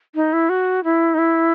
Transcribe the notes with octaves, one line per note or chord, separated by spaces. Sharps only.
D#4
E4
F#4
E4
D#4
E4